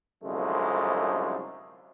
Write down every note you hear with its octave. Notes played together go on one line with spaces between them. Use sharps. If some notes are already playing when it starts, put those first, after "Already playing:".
C2 F#2 D3 F3 G#3 A3